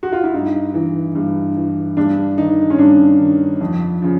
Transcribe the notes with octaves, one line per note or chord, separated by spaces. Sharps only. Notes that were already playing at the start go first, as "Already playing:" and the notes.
F#4
F4
E4
G2 D#4
E3
G2
E3
G2 D4
D#3 D#4
C#4
G2 D4
D#3
F2
C#3 F3